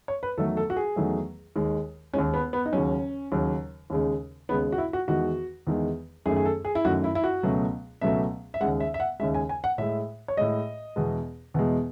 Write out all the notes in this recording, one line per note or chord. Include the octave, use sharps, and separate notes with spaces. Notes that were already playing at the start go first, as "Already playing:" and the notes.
C#5
B4
E2 D#3 F#3 A3 A4
A4
F#4
G#4
E2 D#3 F#3 A3
D#2 D#3 G#3
D#2 D#3 G#3 C#4
B3
B3
D#4
D#2 C#3 F#3 C#4
D#2 C#3 F#3
D#2 C#3 G#3
D#2 C#3 G#3 B3
F#4
E4
F#4
E2 D#3 G#3 F#4
E2 D#3 G#3
F#2 D#3 A3 G#4
G#4
A4
G#4
E4
F#2 D#3 A3 F#4
E4
E4
F#4
C#2 B2 F#3 A3
C#2 B2 F#3 A3 E5
E5
D#2 C#3 G#3 F#5
E5
E5
F#5
D#2 C#3 G#3 E5
G#5
G#5
F#5
A2 G#3 E5
C#5
A2 G#3 D#5
E2 B2 G#3
E2 B2 G#3